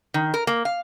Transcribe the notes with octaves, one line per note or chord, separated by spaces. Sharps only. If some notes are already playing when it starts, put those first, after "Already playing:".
D#3
A#4
A#3
F5